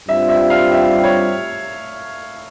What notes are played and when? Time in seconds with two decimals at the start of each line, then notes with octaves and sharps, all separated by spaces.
0.08 G2 G3 C4 F4 E5
0.29 E5
0.50 F5
0.72 E5
1.04 C#5